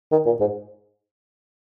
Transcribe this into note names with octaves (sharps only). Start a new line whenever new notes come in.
D#3
A#2
G#2